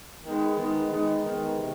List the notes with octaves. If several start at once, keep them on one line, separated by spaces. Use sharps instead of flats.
D#3 G#3 B3 D#4
D#3 G#3 B3 D#4
D#3 G#3 B3 D#4
D#3 G#3 B3 D#4
C3 D#3